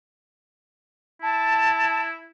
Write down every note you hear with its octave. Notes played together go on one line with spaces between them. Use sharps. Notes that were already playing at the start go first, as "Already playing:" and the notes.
E4 A5